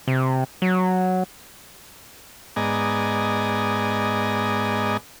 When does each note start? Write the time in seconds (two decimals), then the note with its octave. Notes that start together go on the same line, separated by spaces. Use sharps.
0.08 C3
0.62 F#3
2.56 G#2 B3 D5 D#5 G#5 A#5